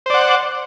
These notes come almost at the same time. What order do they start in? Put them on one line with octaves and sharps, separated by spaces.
C5 D5 F#5